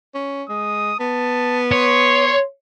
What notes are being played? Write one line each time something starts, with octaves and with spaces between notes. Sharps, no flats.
C#4
G#3 D#6
B3 A5
C#5 C6